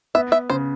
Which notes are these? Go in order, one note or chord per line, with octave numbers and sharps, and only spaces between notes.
B3 E5
E5
C#3 C5